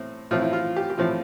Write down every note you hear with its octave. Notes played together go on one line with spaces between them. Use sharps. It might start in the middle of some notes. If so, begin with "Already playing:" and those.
Already playing: A2 C4
A2 F3 C4 E4 F4
E4
F4
G4
G4
A2 F3 C4 E4 F4